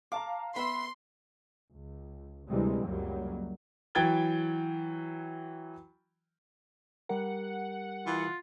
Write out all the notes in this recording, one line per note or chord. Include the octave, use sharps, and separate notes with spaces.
F5 A5 A#5 D6
B3 E5 B5 C6
C#2
D2 C3 E3 G3 G#3 C4
C#2 F#2 F#3 G3 A#3
E3 F#3 G5 G#6 A6 G7
G3 G4 A#4 F#5
E3 F4